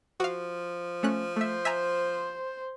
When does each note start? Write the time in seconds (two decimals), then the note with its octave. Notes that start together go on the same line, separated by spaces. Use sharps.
0.20 F3 F#4 F5
1.03 A3 C#4 F#6
1.36 A3 C5 E5
1.65 E5 G#5 A#5